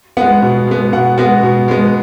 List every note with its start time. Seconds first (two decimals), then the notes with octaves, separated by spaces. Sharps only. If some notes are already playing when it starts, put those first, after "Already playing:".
0.17 G#3 B3 F#5
0.42 B2
0.67 G#3 B3
0.92 B2 F#5
1.18 G#3 B3 F#4
1.43 B2
1.68 G#3 B3